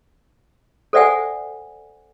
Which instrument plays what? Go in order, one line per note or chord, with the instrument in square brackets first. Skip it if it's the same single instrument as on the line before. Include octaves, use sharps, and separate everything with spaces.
[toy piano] A4 C5 D5 E5 F#5 G#5